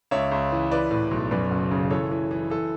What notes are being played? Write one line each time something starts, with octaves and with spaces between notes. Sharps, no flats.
C#2 C#5 E5
C#2
E3
E3 B4 D5
A2
B1
F#2 B4 D5
F#1
C#3
E3 A4 C#5
E3
E3
E3 A4